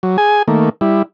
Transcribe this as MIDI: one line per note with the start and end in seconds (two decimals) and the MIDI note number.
0.03 0.17 54
0.18 0.43 68
0.18 0.43 80
0.48 0.69 51
0.48 0.69 57
0.48 0.69 58
0.81 1.02 55
0.81 1.02 64